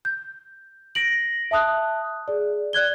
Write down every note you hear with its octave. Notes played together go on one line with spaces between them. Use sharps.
G6
A#6 D7 F#7
E5 A5 D#6 F#6
G#4 D5
D5 F#6 G#6 G7